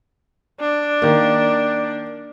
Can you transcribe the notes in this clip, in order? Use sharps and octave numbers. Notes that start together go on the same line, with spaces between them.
D4
D#3 A#3